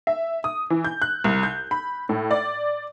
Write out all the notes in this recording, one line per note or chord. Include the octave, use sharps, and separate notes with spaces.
E5
D#6
E3
G6
F#6
C2
G6
B5
A2
D5